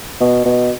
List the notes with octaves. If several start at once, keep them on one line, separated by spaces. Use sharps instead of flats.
B2
B2